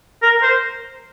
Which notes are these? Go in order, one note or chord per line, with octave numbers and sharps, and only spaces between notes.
A#4
C5